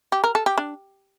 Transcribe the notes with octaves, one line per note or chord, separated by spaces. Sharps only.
G4
A#4
A4
G4
D4